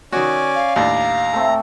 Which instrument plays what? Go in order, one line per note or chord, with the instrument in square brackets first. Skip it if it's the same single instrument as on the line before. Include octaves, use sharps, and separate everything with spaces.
[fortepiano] D#3 F#4 [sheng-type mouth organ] C#4 D5 G#5
[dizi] F5
[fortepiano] D#2 A2 D4 [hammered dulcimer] D5 [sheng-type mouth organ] A#5
[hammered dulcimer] A3 C4